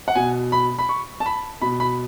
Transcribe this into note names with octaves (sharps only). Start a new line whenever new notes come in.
F#5
B2 G#5
B5
B5
C#6
A5
B5
B2 B5
B5